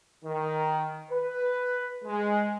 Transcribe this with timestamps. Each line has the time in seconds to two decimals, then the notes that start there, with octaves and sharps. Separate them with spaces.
0.24 D#3
1.11 B4
2.04 G#3